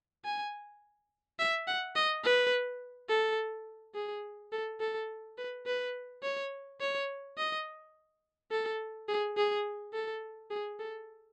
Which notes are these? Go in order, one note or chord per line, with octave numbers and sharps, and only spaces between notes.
G#5
E5
F#5
D#5
B4
A4
G#4
A4
A4
B4
B4
C#5
C#5
D#5
A4
G#4
G#4
A4
G#4
A4